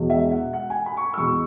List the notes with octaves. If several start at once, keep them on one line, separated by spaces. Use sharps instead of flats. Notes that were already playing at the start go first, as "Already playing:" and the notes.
Already playing: E1 E2 B2 G#3
E5
F#5
F#5
G#5
B5
C#6
B5
E6
E2 B2 G#3 C#6